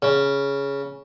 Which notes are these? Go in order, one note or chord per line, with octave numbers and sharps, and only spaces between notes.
C#3